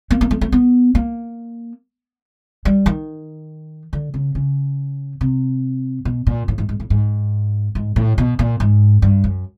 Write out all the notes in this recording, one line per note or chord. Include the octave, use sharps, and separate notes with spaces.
A#3
A#3
A3
A3
B3
A#3
G3
D#3
D3
C#3
C#3
C3
B2
A#2
A2
G#2
G#2
A2
G#2
G#2
A2
B2
A#2
G#2
G2
F#2